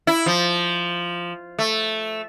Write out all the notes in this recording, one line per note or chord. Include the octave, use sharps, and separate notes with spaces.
E4
F3
A3